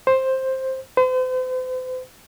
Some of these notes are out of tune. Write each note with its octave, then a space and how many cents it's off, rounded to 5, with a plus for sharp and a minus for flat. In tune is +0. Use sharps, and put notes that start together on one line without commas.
C5 +10
C5 -40